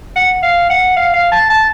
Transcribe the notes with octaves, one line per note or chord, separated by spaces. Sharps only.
F#5
F5
F#5
F5
F5
A5
A5